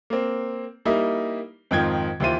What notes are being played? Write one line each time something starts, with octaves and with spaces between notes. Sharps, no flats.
A#3 C4
G3 A#3 D#4 E4
F2 G#2 D#3 F4 G5 G#6
D#2 E3 E4 F4 C5 D#7